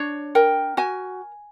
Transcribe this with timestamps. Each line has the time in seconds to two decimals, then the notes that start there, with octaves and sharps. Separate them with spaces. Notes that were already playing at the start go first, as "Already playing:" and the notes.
Already playing: D4 C#5
0.35 A#4 G5
0.77 F#4 G#5